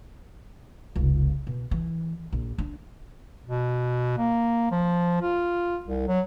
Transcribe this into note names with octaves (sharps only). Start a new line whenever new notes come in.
F1 C#2
B2
E3
A#1
D4
B2
A#3
F3
F4
C2
F#3